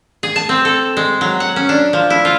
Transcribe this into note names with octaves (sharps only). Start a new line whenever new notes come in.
G#4
A5
C4
A4
G#3
F#3
F#5
C#4
D4
F3
E4
F4